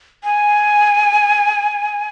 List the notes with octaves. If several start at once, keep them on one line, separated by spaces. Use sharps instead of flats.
G#5